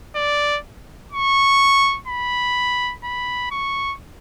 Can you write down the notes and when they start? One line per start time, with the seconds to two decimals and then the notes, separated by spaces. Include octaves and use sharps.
0.16 D5
1.12 C#6
2.08 B5
3.04 B5
3.51 C#6